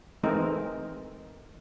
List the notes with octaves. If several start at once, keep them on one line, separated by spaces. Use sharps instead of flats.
E3 G#3 A3 C4 D#4 A#4